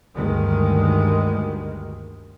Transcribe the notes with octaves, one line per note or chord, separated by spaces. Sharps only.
D2 G2 D#3 G#3